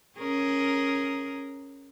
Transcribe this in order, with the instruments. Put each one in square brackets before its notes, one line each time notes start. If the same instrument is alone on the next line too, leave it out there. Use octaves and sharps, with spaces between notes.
[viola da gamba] C#4 G#4 A#4